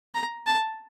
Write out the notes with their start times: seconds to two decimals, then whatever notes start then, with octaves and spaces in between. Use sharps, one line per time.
0.14 A#5
0.47 A5